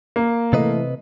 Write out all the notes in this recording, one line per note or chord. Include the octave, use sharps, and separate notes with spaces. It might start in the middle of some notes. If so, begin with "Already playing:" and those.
A#3
C3 E3 A3 B4 D#5